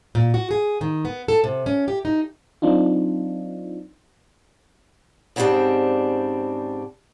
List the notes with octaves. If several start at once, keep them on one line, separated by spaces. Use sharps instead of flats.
A#2
F#4
G#4
D#3
B3
A4
C3
C#4
G4
D#4
F#3 C4 D4 D#4 F4
G#2 C#3 G3 A#3 C4 D4